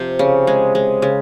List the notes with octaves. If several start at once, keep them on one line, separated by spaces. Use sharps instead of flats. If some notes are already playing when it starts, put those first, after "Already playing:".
Already playing: C3 F3 C5
C#3
G#3
G#3
C#3